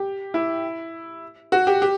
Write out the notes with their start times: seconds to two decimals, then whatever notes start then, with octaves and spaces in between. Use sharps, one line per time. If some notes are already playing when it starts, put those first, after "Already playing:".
Already playing: G4
0.34 E4
1.52 F#4
1.67 G4
1.82 G4